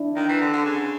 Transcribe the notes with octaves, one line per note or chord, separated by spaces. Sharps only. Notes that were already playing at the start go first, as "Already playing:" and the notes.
Already playing: D4 E4
D#3
E3
D3
D3
C#3